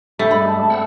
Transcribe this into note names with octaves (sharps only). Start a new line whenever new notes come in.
A3 D4 G4 B5
G2 G3 G#3 D5 E5 B5
A5
C4 F#5 E6